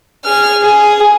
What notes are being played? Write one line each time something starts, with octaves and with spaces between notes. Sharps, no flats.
G#4 F6
G#4